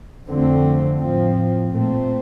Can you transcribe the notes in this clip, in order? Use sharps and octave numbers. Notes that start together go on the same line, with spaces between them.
F2 D3 A3 C4
A2 F3 C4
A#2 A3 C4